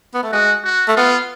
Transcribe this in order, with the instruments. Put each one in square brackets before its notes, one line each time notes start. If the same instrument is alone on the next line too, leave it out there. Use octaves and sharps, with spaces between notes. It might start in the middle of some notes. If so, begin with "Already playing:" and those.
[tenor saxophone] B3
A3
[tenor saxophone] G#3 [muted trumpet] F#4
[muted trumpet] F#4
[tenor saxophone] A3
[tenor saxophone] B3 [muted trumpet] F4